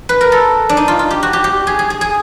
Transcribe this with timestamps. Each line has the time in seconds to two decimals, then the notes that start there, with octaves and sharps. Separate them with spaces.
0.09 B4
0.21 A#4
0.32 A4
0.69 D4
0.77 D#4
0.88 F4
0.99 F4
1.10 G4
1.23 F#4
1.33 G4
1.44 G4
1.67 G#4
1.79 G#4
1.90 G#4
2.01 G#4